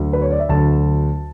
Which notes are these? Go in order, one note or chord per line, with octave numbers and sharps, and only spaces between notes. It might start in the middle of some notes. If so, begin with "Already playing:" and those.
Already playing: D2 D3 F#3
B4
C#5
D5
E5
D2 D3 F#3 A5